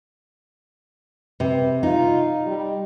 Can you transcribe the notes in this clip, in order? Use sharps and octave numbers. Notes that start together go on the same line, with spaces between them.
C3 B4
D#4 F4
G3